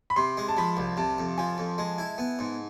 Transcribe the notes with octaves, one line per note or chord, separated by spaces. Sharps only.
B5
C3 C6
G#3
A5
F3 B5
C2
C3 A5
F2
F3 G#5
F2
G#3
E4
B3
G#2